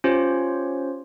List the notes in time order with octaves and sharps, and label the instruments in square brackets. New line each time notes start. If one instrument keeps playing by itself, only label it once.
[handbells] C#4 F4 G4 C5 C#5